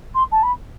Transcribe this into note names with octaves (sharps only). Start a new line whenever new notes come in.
C6
A5
B5